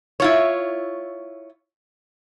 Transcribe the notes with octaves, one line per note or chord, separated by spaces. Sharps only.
E4 F4 C#5